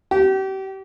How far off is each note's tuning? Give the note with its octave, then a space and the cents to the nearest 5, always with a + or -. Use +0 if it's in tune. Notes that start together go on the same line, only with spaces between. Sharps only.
G4 -35